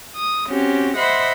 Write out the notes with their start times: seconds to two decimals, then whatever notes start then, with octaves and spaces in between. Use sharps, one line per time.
0.17 D#6
0.47 C4 C#4 F#4 G4
0.98 C5 D#5 E5 F#5 B5 C6